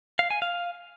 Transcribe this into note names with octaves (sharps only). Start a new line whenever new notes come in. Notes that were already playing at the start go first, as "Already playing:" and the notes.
F5
G#5
F5